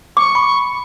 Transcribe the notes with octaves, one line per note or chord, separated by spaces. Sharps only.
C#6 D6
B5